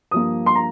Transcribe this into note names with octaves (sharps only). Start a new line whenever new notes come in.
G2 F3 A#3 D#6
C6
A#5